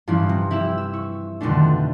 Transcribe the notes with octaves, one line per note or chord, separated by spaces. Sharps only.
G2 E3 F3 C#4 E4
C3
E4 G4 E6 E7
E6
C#6 E6
F2 B2 D3 D#3 A3 D4